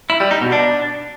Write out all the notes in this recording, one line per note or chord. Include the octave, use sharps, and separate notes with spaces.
E4
G3
D#4
B2
D4